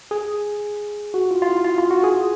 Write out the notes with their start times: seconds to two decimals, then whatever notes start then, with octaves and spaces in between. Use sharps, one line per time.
0.11 G#4
1.14 F#4
1.31 F4
1.42 F4
1.48 E4
1.64 F4
1.78 F4
1.91 F#4
2.04 G#4